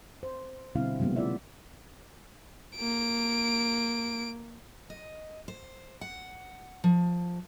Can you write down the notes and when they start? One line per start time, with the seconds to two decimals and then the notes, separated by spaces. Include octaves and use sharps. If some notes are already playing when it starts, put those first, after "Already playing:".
0.23 C5
0.75 B2 D3 G3 C4 E4 F5
1.00 C3 F#3 G#3 A#3 B3
1.16 E4 F4 D5 E5
2.76 A#3 D7
4.90 D#5
5.48 C5
6.01 F#5
6.84 F3